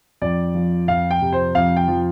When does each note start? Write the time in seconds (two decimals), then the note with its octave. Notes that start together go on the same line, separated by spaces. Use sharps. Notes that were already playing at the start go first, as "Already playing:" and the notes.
0.21 F2 D5
0.54 F3
0.88 F2 F5
1.10 G5
1.21 C3
1.33 C5
1.54 F2 F5
1.76 G5
1.88 F3